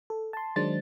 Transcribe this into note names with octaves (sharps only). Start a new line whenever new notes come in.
A4
A5 C6
D#3 F#3 G#3 D4 C5 A6